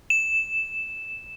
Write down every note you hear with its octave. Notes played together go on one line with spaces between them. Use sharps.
E7